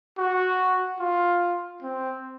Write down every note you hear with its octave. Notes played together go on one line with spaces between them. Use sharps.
F#4
F4
C4